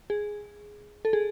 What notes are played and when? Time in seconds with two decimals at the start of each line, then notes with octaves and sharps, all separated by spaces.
0.10 G#4
1.05 A4
1.13 G#4